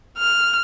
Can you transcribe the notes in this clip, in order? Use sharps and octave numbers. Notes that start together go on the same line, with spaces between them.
F6